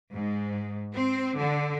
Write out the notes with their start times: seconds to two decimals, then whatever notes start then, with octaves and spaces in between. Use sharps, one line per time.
0.13 G#2
0.94 C4
1.39 D3